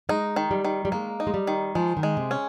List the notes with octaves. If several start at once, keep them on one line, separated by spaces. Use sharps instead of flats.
G#3 D#4
D#3
G3
D#3
G3
G#3 A#3
D#4
G#3
G3
D#3
F3 G#3
D#3
G#3
C3
C#4